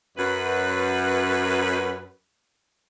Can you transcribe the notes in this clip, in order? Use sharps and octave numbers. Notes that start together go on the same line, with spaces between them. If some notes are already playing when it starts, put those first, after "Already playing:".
F#2 B4